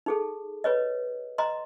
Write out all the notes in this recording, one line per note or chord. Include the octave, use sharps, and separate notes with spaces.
D#4 G#4 A4
B4 C#5 D#5
D#5 A#5 C6